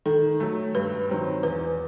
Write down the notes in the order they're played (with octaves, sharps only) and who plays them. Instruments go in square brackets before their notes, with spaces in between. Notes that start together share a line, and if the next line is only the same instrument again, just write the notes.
[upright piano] D#3 [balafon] A4
[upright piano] F#3 A3
[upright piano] G2 [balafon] B4
[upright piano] D#3 F#3 C4
[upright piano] E2 [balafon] B4